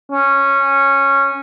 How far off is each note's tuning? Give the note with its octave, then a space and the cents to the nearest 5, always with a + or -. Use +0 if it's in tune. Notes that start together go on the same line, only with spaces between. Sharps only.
C#4 -10